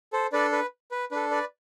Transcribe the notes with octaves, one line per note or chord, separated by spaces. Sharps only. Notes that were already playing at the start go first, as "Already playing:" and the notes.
A4 C5
D4 A4 B4 D5
B4
B4
D4 A4 B4
B4 D5